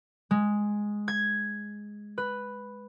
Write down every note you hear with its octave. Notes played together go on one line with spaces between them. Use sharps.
G#3
G#6
B4